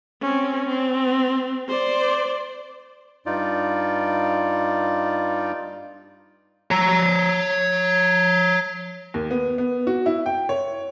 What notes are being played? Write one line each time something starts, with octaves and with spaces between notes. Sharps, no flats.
C4 C#4
C4
C5 D5
G2 D#4 F4 D5
C#5 A#5
D#2
B3
B3
F#4
E4
G5
C#5